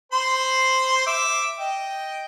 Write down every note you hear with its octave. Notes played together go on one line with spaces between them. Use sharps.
C5 B5 C6
E5 D6
D#5 G5